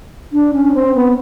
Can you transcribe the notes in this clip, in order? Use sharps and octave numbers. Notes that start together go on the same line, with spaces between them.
D4
C#4
C4
B3